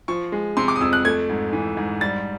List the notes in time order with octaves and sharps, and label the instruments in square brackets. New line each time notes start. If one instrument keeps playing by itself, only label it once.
[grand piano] F3 C#6
G#3
C3 C6
D6
D#6
F2 E6
F#6
A3 G#6
G#2
E3
G#2
G3 A6